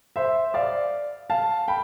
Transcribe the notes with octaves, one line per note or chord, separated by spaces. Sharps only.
C5 E5
D5 F5
F5 A5
G5 B5